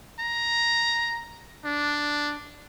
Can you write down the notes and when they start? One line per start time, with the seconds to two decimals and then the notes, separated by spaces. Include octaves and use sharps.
0.20 A#5
1.65 D4